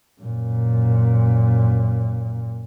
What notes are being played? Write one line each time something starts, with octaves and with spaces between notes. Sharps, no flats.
F#2 A#2